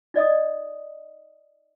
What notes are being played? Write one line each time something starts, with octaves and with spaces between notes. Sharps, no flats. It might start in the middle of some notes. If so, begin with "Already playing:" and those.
D#4 D5 D#5 D#6